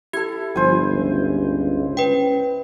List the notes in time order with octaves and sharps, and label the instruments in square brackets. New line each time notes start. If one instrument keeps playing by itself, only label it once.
[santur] E4 A4 [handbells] G4 G#6
[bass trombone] G1 [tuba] F3 [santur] C5 G#5
[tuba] C#2
[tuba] C#4 [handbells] B4 G5